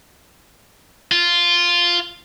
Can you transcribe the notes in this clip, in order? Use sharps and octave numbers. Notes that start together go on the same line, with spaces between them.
F4